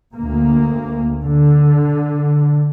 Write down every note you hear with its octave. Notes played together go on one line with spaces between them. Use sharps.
D2 A#3
D3